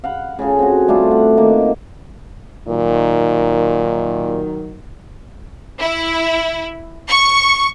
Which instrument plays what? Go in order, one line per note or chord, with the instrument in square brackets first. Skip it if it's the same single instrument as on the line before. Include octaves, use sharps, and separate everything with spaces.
[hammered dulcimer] F5 F#5 B5
C#3 F4 G#4 A4
C4 F#4
G3 A3 D4 F4
F#5
D#3 A#3
[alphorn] A#2 [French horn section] D#3 F#3
[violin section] E4
C#6